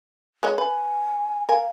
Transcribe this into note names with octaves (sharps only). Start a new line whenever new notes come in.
G#3 C#5 D#5
B4 G#5
A#4 F5 G#5